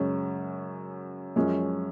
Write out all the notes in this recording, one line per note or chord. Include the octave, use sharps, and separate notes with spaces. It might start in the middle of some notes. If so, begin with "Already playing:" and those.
Already playing: F#2 C#3 G#3 C#4
F#2 F3 G#3 C#4